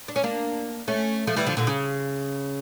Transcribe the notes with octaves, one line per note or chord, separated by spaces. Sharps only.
D4
C#4
A#3 D4
A3 C#4
F3 A3
E3 G3
D3 F3
A#2 D3
C#3